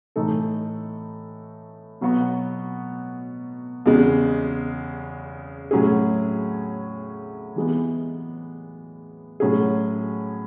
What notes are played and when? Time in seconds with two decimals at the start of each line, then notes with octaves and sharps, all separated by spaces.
0.16 A2 E3 A3 D#4 A4
2.01 B2 F#3 B3 F#4
3.86 E2 C#3 G#3
5.71 A2 F#3 C#4 G#4
7.56 E3 G#3 B3
9.40 A2 F#3 C#4 G#4